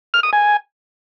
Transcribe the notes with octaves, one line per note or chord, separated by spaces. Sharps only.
F6
D#6
G#5